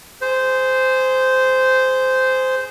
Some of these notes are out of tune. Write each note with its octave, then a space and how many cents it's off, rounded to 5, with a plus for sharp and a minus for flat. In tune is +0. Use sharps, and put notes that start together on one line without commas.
G#4 +0 C5 -10